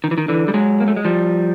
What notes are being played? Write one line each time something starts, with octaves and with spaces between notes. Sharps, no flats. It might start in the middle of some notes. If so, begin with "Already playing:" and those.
D#3
E3
D#3
D3 E3
G3
F#3 G#3
A#3
A3
G#3
F3 G3